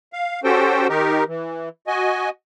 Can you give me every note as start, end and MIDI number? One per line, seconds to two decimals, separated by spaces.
0.13 0.40 77
0.44 0.87 61
0.44 0.87 66
0.44 0.87 67
0.44 0.87 69
0.44 0.87 72
0.44 0.87 79
0.89 1.24 51
0.89 1.24 63
0.89 1.24 67
0.89 1.24 70
1.28 1.69 52
1.87 2.30 66
1.87 2.30 75
1.87 2.30 80